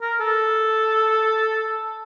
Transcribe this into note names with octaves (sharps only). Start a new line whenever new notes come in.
A#4
A4